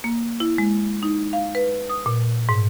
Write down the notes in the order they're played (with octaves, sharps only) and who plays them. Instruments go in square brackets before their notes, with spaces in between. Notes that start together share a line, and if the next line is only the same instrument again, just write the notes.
[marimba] A#3
E4
G#3
D#4
F5
B4
D#6
A#2
G#2